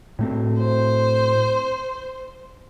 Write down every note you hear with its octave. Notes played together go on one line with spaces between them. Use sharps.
A2 A3 C4
C5